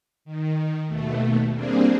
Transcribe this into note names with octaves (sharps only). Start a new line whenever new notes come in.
D#3
D#2 B2 A3
G3 A#3 C4 D4 G#4